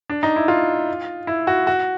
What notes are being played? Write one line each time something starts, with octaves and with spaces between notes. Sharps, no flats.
D4
D#4
E4
F4
E4
F#4
F#4